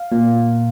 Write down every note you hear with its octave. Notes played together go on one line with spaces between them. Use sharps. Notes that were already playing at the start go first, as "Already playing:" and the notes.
Already playing: F5
A#2